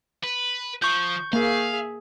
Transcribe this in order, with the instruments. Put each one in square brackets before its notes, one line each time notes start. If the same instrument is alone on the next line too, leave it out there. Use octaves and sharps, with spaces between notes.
[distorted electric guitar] B4
[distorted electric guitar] F3 [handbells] C#6 G6
[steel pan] A#3 [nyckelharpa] G#4 E5 [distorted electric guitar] F5